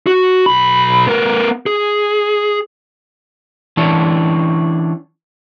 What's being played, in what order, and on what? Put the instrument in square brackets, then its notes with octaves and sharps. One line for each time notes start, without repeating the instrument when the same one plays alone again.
[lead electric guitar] F#4
B1 B5
B3 A#4
G#4
[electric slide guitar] E3 C#4 D4